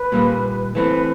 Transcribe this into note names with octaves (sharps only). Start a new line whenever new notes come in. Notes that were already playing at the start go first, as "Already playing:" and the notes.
Already playing: B4
A#2 G3 A#3
E3 A3 C4 B4